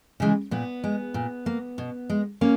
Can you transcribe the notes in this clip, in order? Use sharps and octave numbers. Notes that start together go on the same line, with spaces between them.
C#3 E3 G#3
A#2 B3
G#3
A#2
A#3
B2
G#3
A#3 C#4